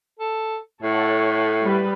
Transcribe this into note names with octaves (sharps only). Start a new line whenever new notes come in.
A4
A2 A4 C#5 F#5
G3 B4